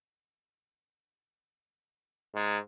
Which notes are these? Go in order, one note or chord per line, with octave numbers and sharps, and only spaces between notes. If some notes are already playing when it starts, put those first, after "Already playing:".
G#2